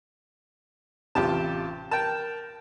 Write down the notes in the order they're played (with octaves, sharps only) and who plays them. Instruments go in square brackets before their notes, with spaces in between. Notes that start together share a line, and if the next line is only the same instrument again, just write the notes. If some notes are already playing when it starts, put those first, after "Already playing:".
[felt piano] A1 C3 [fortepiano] F4 G4 A5
[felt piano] A#4 [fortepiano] G5 A5